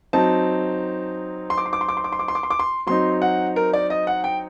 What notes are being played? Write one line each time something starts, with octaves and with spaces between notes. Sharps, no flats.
F#3 C4 D#4 A5
C6
D6
C6
D6
C6
D6
C6
D6
C6
D6
C6
D6
C6
D6
C6
F#3 C4 D#4 C6
F#5
A#4
D5
D#5
F#5
G5